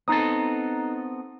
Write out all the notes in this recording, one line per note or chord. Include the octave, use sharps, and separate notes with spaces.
B3 C4 D#4 A4 A#5 D#6